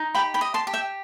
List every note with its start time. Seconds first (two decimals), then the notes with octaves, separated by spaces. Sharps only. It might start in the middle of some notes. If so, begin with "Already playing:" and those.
Already playing: D#4
0.15 G4 G5 B5
0.34 G5 B5
0.41 D#5
0.54 A5 C6
0.67 G4
0.74 E5 G5